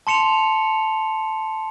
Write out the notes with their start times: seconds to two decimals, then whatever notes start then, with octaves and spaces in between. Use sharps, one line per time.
0.07 A5 C6 C#7 E7 F7